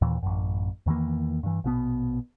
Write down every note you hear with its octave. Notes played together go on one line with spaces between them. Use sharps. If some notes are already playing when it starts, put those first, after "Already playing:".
D#2 A#2 E3
A1 F#2
E2 D#3 E3 A#3
G2 E3
A#1 B2 B3